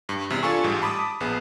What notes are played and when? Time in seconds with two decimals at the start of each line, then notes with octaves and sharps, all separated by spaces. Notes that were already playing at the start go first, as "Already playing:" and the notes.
0.09 G2
0.30 E2 C3
0.43 D4 F4 A4 G#5 C#6
0.64 A1 G#2 G3
0.82 A5 B5 D6 D#6
1.20 A#1 B3 G#4